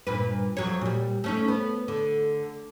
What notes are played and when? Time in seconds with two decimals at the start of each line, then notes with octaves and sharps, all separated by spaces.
0.07 G2 A#2 B4
0.57 F2 F#3 C#5
0.81 A#2 G3
1.24 A3 C#4 D#4
1.48 B3
1.88 D3